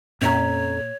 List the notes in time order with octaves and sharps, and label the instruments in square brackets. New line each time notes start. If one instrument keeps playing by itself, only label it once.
[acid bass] F2 [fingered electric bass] A#2 [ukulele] C#4 E5 A#5 [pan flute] C#5